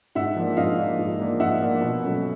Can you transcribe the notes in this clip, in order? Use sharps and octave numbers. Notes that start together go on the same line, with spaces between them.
G#2 E5 F#5
F3 A#3 D4
G#2 D#5 F5
F3 A#3 D4
G#2
F3 A#3 D4
G#2 E5 F#5
F3 A#3 D4
B2
F#3 A3 C#4